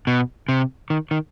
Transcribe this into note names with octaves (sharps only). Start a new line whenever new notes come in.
B2
C3
D#3
D#3